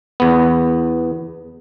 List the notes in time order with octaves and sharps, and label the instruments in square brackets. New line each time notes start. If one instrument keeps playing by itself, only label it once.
[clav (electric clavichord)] E2 B3